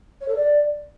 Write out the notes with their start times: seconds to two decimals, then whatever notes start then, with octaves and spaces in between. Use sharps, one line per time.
0.20 C#5
0.28 A4
0.35 D5